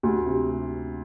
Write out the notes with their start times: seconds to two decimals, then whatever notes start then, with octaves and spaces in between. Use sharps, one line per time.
0.03 D2
0.26 C3